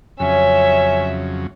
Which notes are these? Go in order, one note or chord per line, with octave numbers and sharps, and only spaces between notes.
F2 C#3 F#3 C#4 C#5 E5